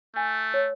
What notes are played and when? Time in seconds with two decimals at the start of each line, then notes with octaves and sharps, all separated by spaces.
0.16 A3 G#5
0.54 C#5